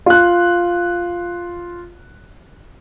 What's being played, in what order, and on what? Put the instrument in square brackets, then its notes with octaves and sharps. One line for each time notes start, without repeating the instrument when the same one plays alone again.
[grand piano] F4 F#6